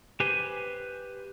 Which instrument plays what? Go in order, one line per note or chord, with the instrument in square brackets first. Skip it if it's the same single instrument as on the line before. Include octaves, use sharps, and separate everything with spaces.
[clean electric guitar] G4 B4 C5 G#5